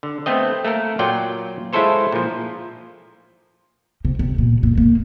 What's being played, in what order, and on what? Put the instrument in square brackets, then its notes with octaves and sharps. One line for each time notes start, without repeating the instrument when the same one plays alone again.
[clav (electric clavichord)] D3
A3 B3 C4 D#5
A3 A#3 A4 A#4
A#2 F#3 F4 D5 G5
G#3 E4 F4 A4 C5 C#5
A#2 F3
[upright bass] C3
C3
A#2
A#2
A#3